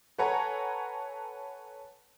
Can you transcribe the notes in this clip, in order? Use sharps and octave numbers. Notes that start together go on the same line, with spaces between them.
A4 B4 C#5 F#5 G#5 A#5